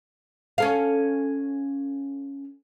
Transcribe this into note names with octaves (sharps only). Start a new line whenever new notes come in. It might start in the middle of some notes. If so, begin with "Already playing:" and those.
C#4 A4 F5